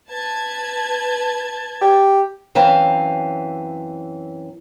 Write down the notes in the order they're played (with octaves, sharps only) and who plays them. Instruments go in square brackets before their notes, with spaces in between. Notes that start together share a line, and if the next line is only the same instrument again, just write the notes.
[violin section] B4 A5 G#6
[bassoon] G4
[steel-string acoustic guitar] F#2 E3 C4 F5 G#5 A#5